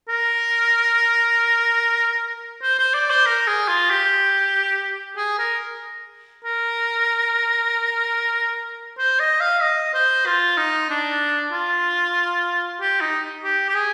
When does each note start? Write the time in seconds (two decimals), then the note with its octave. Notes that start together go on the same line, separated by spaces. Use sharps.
0.09 A#4
2.62 C5
2.79 C5
2.94 D5
3.10 C5
3.26 A#4
3.47 G#4
3.68 F4
3.90 G4
5.17 G#4
5.39 A#4
6.45 A#4
8.98 C5
9.20 D#5
9.40 F5
9.62 D#5
9.94 C5
10.26 F4
10.57 D#4
10.90 D4
11.52 F4
12.80 G4
13.01 D#4
13.43 G4
13.69 G4
13.75 G#4